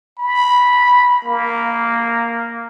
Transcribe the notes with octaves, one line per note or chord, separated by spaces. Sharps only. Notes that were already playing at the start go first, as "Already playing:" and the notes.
B5
A#3